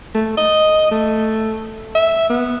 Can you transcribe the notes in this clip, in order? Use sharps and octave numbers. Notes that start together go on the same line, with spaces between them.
A3
D#5
A3
E5
B3